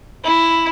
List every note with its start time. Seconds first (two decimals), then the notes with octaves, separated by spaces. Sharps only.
0.24 E4